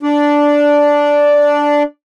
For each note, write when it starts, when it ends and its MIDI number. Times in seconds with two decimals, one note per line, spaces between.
0.03 1.83 62
0.03 1.83 74